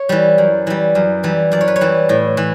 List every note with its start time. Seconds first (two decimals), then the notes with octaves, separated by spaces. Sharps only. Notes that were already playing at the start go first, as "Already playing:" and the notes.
Already playing: C#5
0.09 E3 G3
0.38 F#2
0.67 E3 G3
0.95 F#2
1.24 E3 G3
1.52 F#2 D5
1.61 C#5
1.68 B4
1.76 C#5
1.81 E3 G3
2.09 A2
2.37 E3